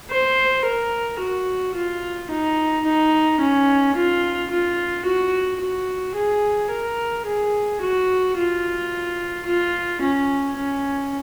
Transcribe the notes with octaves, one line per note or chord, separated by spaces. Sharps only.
C5
A#4
F#4
F4
D#4
D#4
C#4
F4
F4
F#4
F#4
G#4
A#4
G#4
F#4
F4
F4
C#4
C#4